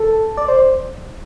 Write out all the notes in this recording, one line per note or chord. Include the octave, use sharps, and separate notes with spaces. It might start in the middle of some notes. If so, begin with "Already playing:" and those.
Already playing: A4
D5
C5